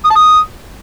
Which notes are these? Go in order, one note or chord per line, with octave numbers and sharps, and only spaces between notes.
D#6
A5
D#6